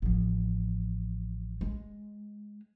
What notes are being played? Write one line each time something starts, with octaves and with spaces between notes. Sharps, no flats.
A1 F3
G#3